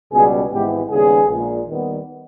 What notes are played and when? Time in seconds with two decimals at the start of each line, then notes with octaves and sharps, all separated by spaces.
0.13 C#2 B2 G3 B3 G#4
0.52 G#1 G#2 E3 G#3 B3 G4
0.90 D#2 C#3 G3 B3 G#4
1.29 A#1 A#2 G#3
1.67 D#2 D#3 G3 B3